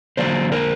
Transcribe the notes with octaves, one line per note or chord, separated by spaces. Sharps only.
D3 F#3 A#3 C5 D5
A#4 C5